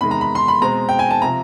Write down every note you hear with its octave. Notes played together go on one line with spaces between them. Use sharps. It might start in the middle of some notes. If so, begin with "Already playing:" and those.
E2 C3 D#3 G#3 B5
A#5
B5
C6
B5
B2 G#3 C4 A#5
G5
G#5
A5
C3 F3 A#5